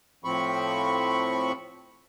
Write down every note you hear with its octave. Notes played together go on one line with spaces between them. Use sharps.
A2 F3 C4 B5 C#6